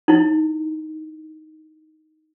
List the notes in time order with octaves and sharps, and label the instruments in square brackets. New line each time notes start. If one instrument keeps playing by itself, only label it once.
[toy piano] D#4 E4